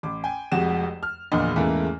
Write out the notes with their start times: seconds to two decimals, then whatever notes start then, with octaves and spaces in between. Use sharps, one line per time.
0.03 A1 D6
0.24 G5 G#5
0.52 F1 F2 G#3 F#4 G4 E7
1.03 F6
1.32 A#1 E2 A#2 D3 D#5
1.56 E2 G#2 C#3 E3 A3 A#3